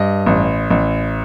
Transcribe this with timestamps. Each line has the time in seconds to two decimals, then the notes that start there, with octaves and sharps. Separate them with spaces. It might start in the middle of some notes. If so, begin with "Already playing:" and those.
Already playing: G2 D#5
0.26 A1
0.70 A1